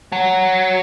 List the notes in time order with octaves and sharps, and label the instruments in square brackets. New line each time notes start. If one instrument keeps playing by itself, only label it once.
[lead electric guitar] F#3